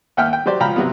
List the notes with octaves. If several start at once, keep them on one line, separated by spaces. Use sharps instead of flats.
D#2 E5 F#5 G5 F6
G5
F#3 G4 C5 D5
C#2 F3 F5 G5 A#5 B5
C3 F#3 B3